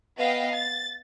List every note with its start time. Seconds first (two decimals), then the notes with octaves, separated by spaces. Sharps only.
0.17 B3 D#5 F5 G5
0.52 A6